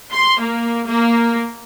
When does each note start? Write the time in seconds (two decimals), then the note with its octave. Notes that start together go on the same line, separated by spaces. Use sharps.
0.12 C6
0.40 A#3
0.86 A#3